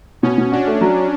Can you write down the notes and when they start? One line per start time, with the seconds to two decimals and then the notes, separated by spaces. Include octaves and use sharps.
0.22 B2 C#4
0.38 B2
0.52 D4 F#4
0.67 A3
0.81 F#3